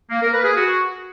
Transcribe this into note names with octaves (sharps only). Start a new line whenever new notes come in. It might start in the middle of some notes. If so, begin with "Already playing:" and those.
A#3
A#4
B4
G#4
F#4